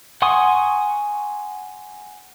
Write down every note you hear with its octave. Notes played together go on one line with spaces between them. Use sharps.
F#5 G#5 C6 C#6 D#6